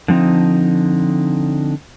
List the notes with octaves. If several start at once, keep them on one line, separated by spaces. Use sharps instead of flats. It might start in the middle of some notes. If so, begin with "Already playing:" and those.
D3 F3 C4 D#4